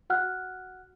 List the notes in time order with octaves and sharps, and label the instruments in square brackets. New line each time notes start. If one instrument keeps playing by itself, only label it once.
[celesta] F#4 F#5 F6 F#6